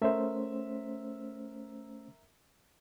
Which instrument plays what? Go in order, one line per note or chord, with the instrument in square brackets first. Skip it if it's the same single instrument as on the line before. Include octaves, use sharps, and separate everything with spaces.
[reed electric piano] A3 C#4 C5 [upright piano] A#4 E5